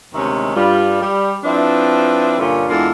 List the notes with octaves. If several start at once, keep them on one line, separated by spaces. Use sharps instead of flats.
D2 C3 D#3 G#3 C#4 E5
G2 G3 F4
G3
F3 C4 D4 E4 B4 E5
G2 A#2 D3 C#4 F4
E2 G#3 D4 F4 A4 A#4